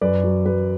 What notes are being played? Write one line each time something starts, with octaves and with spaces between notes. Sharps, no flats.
F#2 B4 D5
F#3
F#3 B4